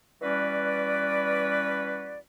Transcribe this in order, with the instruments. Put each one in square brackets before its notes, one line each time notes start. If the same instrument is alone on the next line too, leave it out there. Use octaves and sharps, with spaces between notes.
[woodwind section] E3 G3 C#4 F#4 B4 D5